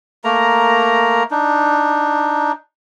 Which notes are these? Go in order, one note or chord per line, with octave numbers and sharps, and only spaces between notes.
A3 A#3 A#4 A#5
D4 D#4